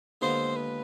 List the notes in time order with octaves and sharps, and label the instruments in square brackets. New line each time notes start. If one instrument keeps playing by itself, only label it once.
[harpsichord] D#2 D3 G#3 B3 F4 [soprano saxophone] C5
[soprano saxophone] B4